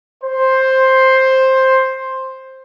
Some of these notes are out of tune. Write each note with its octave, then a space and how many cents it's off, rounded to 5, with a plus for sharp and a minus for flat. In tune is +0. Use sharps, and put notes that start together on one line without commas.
C5 +10